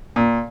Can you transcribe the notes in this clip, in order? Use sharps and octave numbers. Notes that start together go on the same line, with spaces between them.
A#2